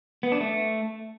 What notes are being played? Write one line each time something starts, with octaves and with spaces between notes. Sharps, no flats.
B3
D4
A3